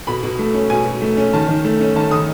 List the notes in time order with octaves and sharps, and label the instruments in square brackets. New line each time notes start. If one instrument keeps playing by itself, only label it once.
[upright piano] B2 B5
B2
A3
C#4
B2 G#5
B2
A3
C#4
D#3 A5
D#3
A3
C#4
D#3 A5
D#3 D#6